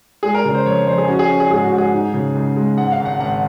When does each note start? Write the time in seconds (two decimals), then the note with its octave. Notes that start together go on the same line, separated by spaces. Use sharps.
0.23 G#3 G#4
0.34 A#4
0.45 C#3 A#4
0.54 C5
0.66 F2 C#5
0.87 F2 C5
0.98 G#4
1.08 C#4 F#4
1.19 G#4
1.30 C#4
1.40 G#4
1.50 G#2 G#4
1.64 F#4
1.72 G#2
1.78 G#4
1.94 D#4
2.14 C#3
2.35 C#2
2.57 G#3
2.77 G#2 F#5
2.92 F5
2.99 G#1
3.05 F#5
3.20 G#1 F#5